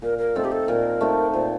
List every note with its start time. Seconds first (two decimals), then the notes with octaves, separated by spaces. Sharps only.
0.02 A#2 A#4
0.18 A#4
0.35 A3 C4 D#4 A4
0.45 G4
0.52 A4
0.68 A#2 A#4
1.01 A3 C4 D#4
1.34 A#2 C5